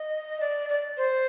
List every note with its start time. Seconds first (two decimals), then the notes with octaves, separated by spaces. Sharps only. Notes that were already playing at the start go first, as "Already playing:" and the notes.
Already playing: D#5
0.40 D5
0.69 D5
0.97 C5